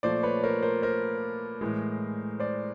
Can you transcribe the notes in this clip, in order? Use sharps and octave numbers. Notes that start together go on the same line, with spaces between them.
A#2 F3 A3 C5 D5
B4 C#5
A#4 C5
A#4 C5
A#4 C5
A2 E3 G#3
C5 D5